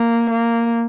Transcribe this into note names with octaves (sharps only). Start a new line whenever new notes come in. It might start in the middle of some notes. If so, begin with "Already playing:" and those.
Already playing: A#3
A#3